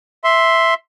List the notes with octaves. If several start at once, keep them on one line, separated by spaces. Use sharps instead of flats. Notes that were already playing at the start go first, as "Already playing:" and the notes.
E5 C6